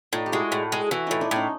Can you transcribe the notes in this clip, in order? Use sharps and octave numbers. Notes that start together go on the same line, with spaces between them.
A2 D#4 F4
G4
G#3 E4 F#4
A2
G#3
E3 E4 F#4
A2 D#4 F4
D4 E4
A2 C#4 D#4